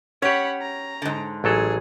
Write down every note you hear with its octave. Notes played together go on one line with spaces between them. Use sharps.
C#4 G4 C#5 F#5 B5
A#5
G#2 D3
A1 F#3 G#4 A4